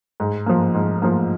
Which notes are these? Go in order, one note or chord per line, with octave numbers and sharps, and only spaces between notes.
G#2
F3 A#3
G#2
F3 A#3